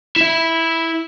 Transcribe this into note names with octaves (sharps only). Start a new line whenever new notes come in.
E4 E5